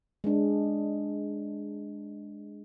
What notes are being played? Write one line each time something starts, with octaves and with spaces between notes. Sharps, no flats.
G#3 D4